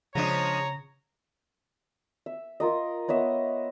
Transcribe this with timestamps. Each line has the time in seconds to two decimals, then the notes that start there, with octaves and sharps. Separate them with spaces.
0.15 C#3 F3 G#3 D4 C#5 A#5
2.26 E5
2.60 F4 A#4 D#5
3.08 B3 C#5 D#5 E5